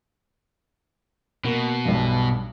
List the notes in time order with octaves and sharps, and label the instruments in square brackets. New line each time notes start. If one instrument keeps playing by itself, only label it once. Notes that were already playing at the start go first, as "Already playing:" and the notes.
[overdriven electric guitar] B2 [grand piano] A#3
[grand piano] B1 G2